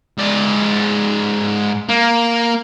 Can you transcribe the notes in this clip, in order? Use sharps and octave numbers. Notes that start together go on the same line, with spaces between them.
G#2 D5
A#3